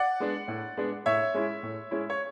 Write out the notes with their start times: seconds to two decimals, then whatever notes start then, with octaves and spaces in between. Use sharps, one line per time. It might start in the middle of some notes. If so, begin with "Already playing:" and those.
Already playing: D5 F#5
0.20 G#3 B3 D4
0.48 A2
0.77 G#3 B3 D4
1.06 A2 C#5 E5
1.34 G#3 C#4 E4
1.63 A2
1.91 G#3 C#4 E4
2.10 C#5